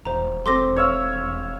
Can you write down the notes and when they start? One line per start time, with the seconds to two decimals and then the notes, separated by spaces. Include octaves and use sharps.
0.05 E1 C5 A#5
0.46 A3 C4 C6 D6 A#6
0.76 C#5 E5 F5